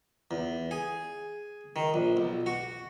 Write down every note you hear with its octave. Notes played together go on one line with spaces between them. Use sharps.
E2
G#4
D#3
A#1
B1
F#4